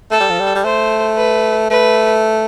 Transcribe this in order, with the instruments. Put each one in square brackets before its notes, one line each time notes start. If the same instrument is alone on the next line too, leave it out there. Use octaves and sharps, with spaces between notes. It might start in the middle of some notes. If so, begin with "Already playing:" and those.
[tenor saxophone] A3 [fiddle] A4
[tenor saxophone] G3
F3
G3
G3
[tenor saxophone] A3 [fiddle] C5
[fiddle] B4
[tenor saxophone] A3 [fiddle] B4